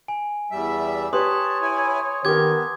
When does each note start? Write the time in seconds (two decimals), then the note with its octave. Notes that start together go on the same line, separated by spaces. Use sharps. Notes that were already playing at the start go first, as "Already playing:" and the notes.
0.08 G#5
0.51 E2 G3 E5
1.13 G4 B4 C#5 A5 C6 D#6
1.62 E4 G#5
2.25 D#3 B3 G4 A#4 D6 G#6